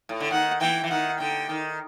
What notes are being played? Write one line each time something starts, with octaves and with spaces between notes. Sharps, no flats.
A2
D3
D#3 F#5
E3 G5
E3
D#3 F#5
D3 G5
D#3